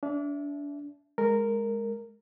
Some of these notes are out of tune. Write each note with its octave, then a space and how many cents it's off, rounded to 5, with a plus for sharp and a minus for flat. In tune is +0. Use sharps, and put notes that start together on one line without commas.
D4 -30 E5 +0
G#3 +0 A#4 -10